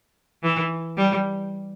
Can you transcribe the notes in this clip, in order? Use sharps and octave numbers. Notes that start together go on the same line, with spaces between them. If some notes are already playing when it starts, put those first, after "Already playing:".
E3
G3